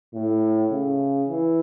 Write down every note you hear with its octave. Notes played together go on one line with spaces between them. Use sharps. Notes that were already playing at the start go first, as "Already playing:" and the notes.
A2
C#3
E3